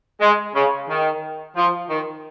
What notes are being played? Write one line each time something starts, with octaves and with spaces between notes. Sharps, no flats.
G#3
C#3
D#3
F3
D#3